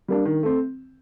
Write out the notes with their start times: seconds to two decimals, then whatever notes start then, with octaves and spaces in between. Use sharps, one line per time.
0.08 G3 A#3 D4
0.25 D#3
0.43 A3 C4